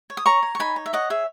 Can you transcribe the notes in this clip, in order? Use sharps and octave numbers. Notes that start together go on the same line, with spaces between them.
C#5
D#6
C#5 A#5 C#6
C#5
C#6
D#4 G#5 B5
C#5
E5
C#5 D#5 F#5
G#4 E5